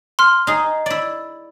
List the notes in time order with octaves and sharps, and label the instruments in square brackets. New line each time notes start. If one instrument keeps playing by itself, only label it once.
[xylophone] C6 F6
[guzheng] D#4 G#4
E4 D5